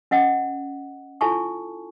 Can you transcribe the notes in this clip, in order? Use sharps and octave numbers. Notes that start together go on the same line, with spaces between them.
C#4 D#5 F#5
E4 F4 A4 G#5 A5 C#6